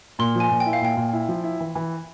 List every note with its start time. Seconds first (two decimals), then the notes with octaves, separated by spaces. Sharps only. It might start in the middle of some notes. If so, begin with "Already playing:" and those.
0.19 A#2 C6
0.36 F3 G#5
0.50 A#2
0.60 G5
0.66 E4
0.73 F5
0.81 A#2 G5
0.97 A#2
1.13 E4
1.29 F3
1.44 E4
1.60 E3
1.75 E3